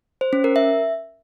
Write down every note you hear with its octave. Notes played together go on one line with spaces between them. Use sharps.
C5
C#4
A#4
E5